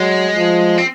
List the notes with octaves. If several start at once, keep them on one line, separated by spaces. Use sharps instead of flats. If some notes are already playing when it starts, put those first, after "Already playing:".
Already playing: F#3 G#3
F3
C4